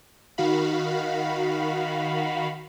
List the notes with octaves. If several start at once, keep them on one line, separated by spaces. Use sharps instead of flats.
D#3 F#4 F5 B5